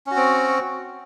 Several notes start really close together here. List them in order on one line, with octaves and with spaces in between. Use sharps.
C#4 F#4 C4